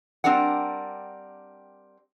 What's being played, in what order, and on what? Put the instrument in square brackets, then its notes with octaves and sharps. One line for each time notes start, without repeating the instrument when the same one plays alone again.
[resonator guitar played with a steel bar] G3 C4 D4 A#4 D5 F#5